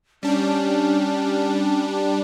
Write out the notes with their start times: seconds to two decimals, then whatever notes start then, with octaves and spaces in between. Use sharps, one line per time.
0.23 G3 C#4 D4